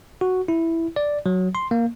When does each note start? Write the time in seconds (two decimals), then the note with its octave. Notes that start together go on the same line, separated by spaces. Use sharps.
0.21 F#4
0.48 E4
0.96 D5
1.26 F#3
1.55 C6
1.71 A#3